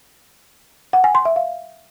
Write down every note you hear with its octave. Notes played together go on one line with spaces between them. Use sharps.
F#5
G#5
C6
E5
F5